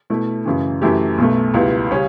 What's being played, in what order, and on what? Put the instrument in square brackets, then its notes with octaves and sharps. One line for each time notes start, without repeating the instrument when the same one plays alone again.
[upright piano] B2 A3 E4
F#2 C#3 E3
F#2 E3 A3 E4 G4
B1 B2 A3
C#2 B2 G3 B3 E4
C#3 G3 C#4